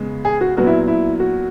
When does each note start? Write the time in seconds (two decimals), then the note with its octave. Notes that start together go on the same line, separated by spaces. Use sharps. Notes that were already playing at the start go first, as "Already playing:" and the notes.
Already playing: C#3 G#3 B3
0.25 G#4
0.41 F#4
0.57 A#2 F#3 B3 F#4
0.67 E4
0.88 E4
1.20 F#4